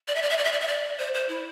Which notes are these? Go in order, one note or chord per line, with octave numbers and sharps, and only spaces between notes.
D5
E5
D5
E5
D5
E5
D5
E5
D5
C5
C5
E4